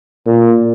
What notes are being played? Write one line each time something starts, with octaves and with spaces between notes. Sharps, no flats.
A#2